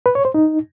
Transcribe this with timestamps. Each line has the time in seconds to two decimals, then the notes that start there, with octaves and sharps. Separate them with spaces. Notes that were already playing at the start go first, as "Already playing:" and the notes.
0.06 B4
0.15 C#5
0.25 C5
0.34 D#4